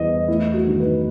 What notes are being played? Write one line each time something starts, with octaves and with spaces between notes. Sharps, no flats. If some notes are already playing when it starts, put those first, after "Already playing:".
Already playing: E2 D#5
A3 E4
F#4
D#3
B4